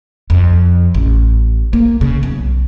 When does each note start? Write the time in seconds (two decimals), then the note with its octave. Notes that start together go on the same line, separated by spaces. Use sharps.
0.30 F2
0.94 A1
1.73 A#3
2.01 C#3
2.23 B1